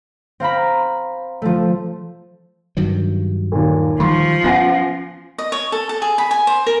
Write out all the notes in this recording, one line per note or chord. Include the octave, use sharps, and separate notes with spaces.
C4 F5 A#5 B5
F3 A3
G2 D#3 F#3
D#2 A#2
D#3 F3 G3 C6 C#6
B3 C#4 F#5 G#5 A#6
D#5
C#5
A4
A4
G#4
B5
G#5
C5
A#4